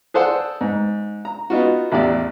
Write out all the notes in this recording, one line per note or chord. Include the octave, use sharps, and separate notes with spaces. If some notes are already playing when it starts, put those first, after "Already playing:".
G#4 A4 C5 D5 F#5
G#2
A#5
B3 D#4 F4 F#4
A1 E2 G4 D5 E5